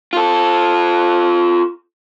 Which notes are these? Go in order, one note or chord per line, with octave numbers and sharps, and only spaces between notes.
F4 A4